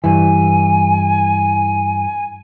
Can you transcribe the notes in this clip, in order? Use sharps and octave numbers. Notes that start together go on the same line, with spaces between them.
G2 E3 G#5